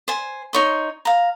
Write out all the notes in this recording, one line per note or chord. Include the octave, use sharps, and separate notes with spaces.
C5 G#5
D#4 C#5 C6
F5 A#5